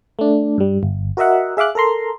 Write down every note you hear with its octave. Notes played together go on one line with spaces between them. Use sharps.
A3 D4
G2 G3
G1
F#4 A#4 D#5 E5 F#5
G#4 E5 F5 D6 F#6
A4 A#4 A#5 C6